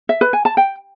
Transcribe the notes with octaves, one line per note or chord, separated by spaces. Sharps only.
E5
B4
G#5
A5
G5